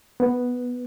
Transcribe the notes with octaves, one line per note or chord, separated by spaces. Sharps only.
B3